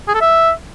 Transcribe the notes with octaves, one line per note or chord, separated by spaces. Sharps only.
G#4
A4
E5